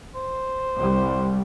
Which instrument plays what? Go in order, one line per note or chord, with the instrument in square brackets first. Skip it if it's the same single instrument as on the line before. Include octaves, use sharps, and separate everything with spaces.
[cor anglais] C5
[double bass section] C2 G3